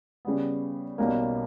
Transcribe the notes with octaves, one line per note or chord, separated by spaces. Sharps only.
C#3 G3 B3
B1 B2 G3 A#3 C#4